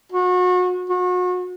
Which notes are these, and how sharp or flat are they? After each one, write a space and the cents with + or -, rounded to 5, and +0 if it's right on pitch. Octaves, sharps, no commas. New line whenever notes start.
F#4 -30
F#4 -35